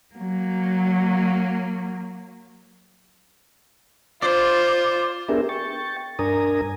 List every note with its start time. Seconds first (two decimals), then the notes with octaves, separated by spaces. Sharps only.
0.15 F#3 A#3
4.22 F4 C5 D5
5.29 B3 D4 G4 G#4 A#4 E5
5.49 G5 C#6 A6
6.19 G2 D4 A#4 G#5 A#5 D#6